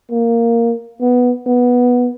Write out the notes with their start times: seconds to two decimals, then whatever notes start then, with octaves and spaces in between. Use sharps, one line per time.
0.11 A#3
1.01 B3
1.46 B3